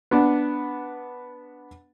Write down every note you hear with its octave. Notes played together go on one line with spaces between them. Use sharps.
B3 D4